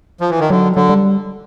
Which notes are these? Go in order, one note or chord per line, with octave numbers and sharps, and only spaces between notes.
F3
E3
D#3
D3 F#3
D3 F#3
G3